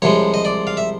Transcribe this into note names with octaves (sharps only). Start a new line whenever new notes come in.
C2 C3 F3 G#3 C#5
D#5
D5
F5
E5